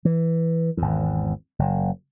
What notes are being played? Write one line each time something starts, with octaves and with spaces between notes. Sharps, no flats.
E3
G#1 E2
F#1